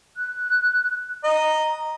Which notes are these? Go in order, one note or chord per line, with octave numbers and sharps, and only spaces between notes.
F#6
D#5 A#5